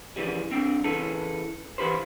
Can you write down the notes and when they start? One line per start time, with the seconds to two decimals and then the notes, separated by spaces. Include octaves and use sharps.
0.16 C#3 E3 F3 G3
0.51 G2 C4 D4 G5
0.84 C#3 E3 A4
1.78 E3 G4 B4 C5